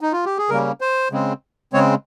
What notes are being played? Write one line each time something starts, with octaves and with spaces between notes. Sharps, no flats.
D#4
F4
G4
G#4
C#3 G3 A#3 C#4 A#4
C5
C#3 G#3 C4
C#3 G#3 C4 C#5